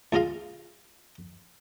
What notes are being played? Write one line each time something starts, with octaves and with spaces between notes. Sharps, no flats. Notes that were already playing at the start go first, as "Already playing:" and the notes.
C#2 G#3 F4 D#5 F5